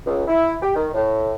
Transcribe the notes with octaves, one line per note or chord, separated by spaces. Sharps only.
C#2
E4
G4
D#3
A2